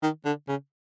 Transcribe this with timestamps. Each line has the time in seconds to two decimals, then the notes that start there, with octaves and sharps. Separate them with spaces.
0.02 D#3
0.25 D3
0.48 C#3